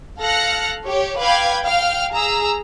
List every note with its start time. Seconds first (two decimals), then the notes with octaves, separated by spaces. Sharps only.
0.20 A4 F5 F6 F#6 A#6 C#7
0.85 G4 C#5
1.18 B4 F5 G5 B5 D6 G#6
1.64 F5 G5 F6
2.12 G#4 A#5 E6